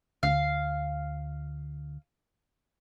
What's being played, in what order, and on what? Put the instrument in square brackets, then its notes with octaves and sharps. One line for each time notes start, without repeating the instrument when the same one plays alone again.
[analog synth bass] D2 [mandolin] F5